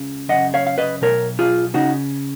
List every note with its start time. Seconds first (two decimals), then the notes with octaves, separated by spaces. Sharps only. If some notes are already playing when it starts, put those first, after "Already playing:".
Already playing: C#2 C#3
0.29 F#2 C#3 D#5 F#5
0.54 C#5 F5
0.67 F5
0.78 B4 D#5
1.02 B1 B2 A#4 C#5
1.39 F4 G#4
1.74 C#3 D#4 F#4